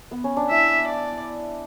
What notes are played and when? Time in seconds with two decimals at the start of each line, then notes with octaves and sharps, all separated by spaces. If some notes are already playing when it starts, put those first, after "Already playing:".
0.11 B3
0.24 C#4
0.37 D4
0.50 E4 E5
0.87 D5